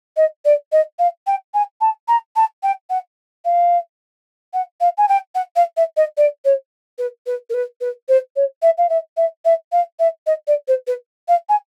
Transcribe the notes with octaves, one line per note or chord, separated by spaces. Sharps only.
D#5
D5
D#5
F5
G5
G#5
A5
A#5
A5
G5
F#5
F5
F#5
F5
G#5
G5
F#5
F5
E5
D#5
D5
C#5
B4
B4
A#4
B4
B4
C5
C#5
E5
F5
E5
E5
E5
F5
E5
D#5
D5
C5
B4
F5
G#5